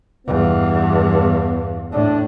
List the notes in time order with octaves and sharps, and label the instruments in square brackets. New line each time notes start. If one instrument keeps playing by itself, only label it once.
[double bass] E2 G2 [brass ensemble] B3 F5
[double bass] A2 [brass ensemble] D4